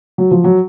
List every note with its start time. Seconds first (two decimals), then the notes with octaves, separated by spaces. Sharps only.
0.18 F#3
0.31 F3
0.44 F#3